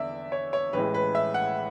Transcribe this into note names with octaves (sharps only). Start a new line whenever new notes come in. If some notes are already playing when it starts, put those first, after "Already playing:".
Already playing: E2 D3 D5 E5
C#5
C#5
A1 A2 G#3 B4
B4
E5
F#5